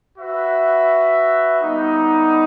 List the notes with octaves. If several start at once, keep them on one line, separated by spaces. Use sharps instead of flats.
F#4 B4 E5
G3 B3 D#4